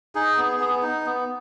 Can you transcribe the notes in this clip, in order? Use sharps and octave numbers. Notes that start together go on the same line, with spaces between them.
D#4 G#4
B3
B3
D#4
B3